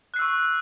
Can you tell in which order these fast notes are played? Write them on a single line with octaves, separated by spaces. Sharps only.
F#6 C7 E6 C#6